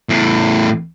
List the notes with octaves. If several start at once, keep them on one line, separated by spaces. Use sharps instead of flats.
E2 A2